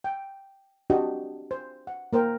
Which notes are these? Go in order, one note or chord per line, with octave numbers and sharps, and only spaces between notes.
G5
C4 D4 F#4 G4 D#5
C5
F#5
A#3 A#4 C5 G5